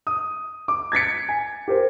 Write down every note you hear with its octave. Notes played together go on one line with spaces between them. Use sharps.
D#6
D6
G#6 A6 B6 C#7
G#5
G4 A#4 C5